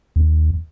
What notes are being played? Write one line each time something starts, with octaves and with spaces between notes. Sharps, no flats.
D#2